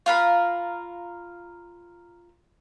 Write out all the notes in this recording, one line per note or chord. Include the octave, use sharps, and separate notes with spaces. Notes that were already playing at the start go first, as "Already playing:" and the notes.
F4 A#4 B5